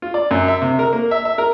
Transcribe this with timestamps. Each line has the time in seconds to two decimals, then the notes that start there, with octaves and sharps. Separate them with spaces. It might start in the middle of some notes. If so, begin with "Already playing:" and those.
0.02 F4
0.14 D5
0.31 F#2
0.48 E5
0.62 C3
0.79 A#4
0.93 A#3
1.11 E5
1.25 E5
1.38 A#4